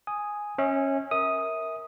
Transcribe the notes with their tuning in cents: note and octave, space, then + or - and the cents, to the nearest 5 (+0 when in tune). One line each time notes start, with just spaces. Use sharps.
G#5 +0 D#6 +0
C#4 -15 E5 -45
A#4 +0 E5 -30 D#6 +0